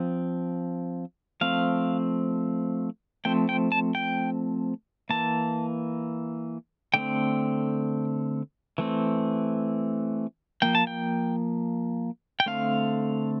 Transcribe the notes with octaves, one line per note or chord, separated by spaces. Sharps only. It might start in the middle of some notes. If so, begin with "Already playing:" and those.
Already playing: F3 C4
F3 A3 C4 F5
F3 A3 C4 G5
G5
A5
G5
E3 A#3 A5
D3 A3 C4 G5
E3 A3 C4
F3 A#3 G5
A5
G5
G5
D3 A3 C4 F5